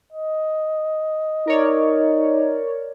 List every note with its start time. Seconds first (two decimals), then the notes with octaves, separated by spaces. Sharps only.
0.13 D#5
1.47 D#4 A#4 C#5 D5